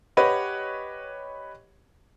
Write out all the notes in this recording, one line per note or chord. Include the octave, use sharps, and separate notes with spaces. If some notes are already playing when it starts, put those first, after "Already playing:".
G4 B4 C#5 D#5 F#5